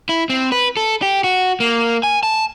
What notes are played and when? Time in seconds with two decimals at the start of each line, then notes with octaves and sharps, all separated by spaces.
0.09 E4
0.30 C4
0.52 B4
0.77 A4
1.02 G4
1.24 F#4
1.60 A#3
2.03 G#5
2.23 A5